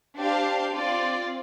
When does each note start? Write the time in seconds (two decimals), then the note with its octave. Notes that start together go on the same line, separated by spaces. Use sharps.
0.17 D4 G4 C5 F5
0.75 C4 F4 D5